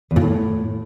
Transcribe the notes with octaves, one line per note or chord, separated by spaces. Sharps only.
E2
A#2
A2